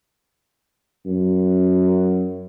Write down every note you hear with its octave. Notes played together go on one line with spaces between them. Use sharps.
F#2